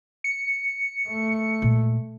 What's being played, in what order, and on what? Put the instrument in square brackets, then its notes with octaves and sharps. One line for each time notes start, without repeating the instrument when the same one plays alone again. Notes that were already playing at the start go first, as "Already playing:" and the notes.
[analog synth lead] C#7
[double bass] A3
[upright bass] A#2 G#3